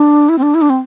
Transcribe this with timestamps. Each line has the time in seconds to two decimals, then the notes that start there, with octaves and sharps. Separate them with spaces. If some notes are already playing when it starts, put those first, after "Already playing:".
Already playing: D4
0.29 E4
0.38 C4
0.43 D4
0.54 E4
0.62 D4
0.70 C4